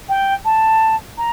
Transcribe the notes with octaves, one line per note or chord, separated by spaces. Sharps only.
G5
A5
A#5